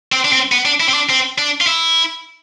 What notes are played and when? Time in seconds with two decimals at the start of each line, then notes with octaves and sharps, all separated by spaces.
0.12 C4
0.25 D4
0.32 C4
0.52 B3
0.65 D4
0.80 E4
0.88 C4
0.94 D4
1.10 C4
1.38 D4
1.61 F4
1.67 E4